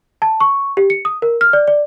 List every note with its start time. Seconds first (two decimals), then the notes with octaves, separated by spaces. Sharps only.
0.22 A5
0.40 C#6
0.77 G4
0.90 C#7
1.05 D#6
1.22 A#4
1.41 F6
1.53 D5
1.68 D5